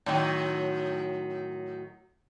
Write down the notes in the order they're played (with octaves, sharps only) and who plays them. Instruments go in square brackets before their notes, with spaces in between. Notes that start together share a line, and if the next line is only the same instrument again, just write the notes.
[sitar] A2 D#3 F#3